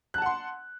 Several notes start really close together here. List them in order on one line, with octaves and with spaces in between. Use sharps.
F#6 A5 F#5 C6